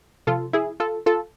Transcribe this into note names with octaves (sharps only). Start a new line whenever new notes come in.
C3 F3 F4 A4
E4 G#4
F4 A4
F4 A4